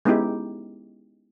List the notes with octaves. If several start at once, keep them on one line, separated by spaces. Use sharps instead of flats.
G#3 B3 C#4 D#4 E4 G4